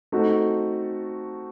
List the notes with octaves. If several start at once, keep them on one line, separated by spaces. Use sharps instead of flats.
A3 C4 D#4 F#4 A4